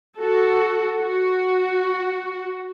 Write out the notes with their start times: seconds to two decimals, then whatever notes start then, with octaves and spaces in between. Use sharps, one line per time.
0.17 F#4 A4
1.00 F#4